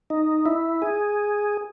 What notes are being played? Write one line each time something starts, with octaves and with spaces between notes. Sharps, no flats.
D#4
E4
G#4